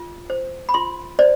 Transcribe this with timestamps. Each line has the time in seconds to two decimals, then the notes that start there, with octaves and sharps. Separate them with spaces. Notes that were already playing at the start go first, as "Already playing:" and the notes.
Already playing: F4
0.30 C5
0.69 B5
0.74 F4 C6
1.19 C5 D5